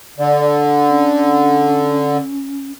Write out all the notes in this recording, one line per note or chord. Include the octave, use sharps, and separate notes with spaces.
D3 D5
C#4